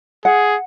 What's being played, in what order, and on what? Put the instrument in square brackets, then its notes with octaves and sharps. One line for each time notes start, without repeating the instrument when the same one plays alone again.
[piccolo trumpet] G#4 [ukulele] F#5